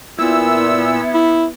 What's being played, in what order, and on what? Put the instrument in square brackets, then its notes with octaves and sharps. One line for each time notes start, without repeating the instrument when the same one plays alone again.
[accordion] A#2 E6 [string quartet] B3 [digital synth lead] E4
[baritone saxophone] E4